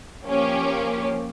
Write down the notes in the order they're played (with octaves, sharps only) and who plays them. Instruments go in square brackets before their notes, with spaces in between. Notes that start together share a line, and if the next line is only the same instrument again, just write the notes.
[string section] F3 A#3 C#4 G4